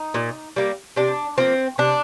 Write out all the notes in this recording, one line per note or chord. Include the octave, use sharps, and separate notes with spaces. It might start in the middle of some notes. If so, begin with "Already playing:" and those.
Already playing: D#4
A#2
G3 A#3
C3 D4
F3 A#3 C4
C3 D4